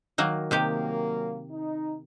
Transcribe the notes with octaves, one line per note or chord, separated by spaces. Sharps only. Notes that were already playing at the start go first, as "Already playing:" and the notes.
D#3 F#3 A#3
C3 D#3 F#3 A#3 G4
D#4